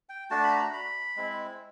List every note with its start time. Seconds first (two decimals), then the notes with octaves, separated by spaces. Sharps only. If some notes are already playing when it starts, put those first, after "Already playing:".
0.09 G5
0.30 A3 D4 F#4 A5
0.44 B5
0.52 A#5
0.73 B5
1.17 G#3 C4 E4